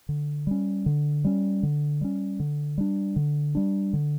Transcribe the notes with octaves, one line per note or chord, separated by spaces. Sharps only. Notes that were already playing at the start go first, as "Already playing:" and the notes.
D3
G3 C#4
D3
G3 C#4
D3
G3 C#4
D3
G3 D4
D3
G3 D4
D3